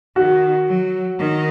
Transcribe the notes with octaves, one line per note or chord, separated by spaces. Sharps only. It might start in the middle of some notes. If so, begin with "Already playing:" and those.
D#3 F#4
F#3
D#3